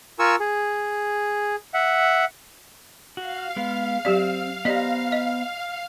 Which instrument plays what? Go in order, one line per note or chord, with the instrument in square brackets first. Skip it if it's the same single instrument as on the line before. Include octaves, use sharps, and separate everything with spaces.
[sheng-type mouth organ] F4 A#4 G#5 C#6 E6
G#4
E5 F#5
[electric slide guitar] F#4 [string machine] F5
[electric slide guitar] G#3 B3
[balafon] F#3 G4 D5 [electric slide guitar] C4
[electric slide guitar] B3 C5 A#5 [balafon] G4 D5 D#5
[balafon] D#5